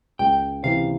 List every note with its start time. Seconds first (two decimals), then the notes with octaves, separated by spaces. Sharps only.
0.19 C#2 G5
0.63 C3 E3 F5